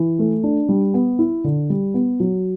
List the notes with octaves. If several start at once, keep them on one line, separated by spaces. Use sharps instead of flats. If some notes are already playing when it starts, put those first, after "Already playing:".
Already playing: E3
A3
D4
G3
B3
E4
D3
G3
B3
F#3